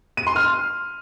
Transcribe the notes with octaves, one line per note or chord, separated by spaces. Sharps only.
D#7
C6
F6